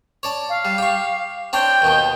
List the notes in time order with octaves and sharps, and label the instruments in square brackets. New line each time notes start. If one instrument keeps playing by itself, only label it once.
[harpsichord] C#5 D5 A5
[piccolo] F5
[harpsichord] G3
G4 C#6
[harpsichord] C4 D4 C#5 [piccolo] G5
[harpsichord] D#2 B2 D#3